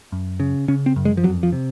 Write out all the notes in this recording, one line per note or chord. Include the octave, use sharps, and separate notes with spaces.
F#2
C#3
C#3 C#4
C4
F#2
G#3
F3
F2 F#3
F3
C3